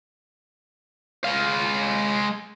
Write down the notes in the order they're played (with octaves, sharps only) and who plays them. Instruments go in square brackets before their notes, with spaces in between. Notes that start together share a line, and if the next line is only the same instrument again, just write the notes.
[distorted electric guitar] G#3 F5